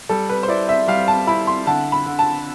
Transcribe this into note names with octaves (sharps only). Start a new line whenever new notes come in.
G3 A4
B4
C5
E4 D5
E5
G3 F5
A5
E4 B5
C6
D3 A5
B5
D3
A5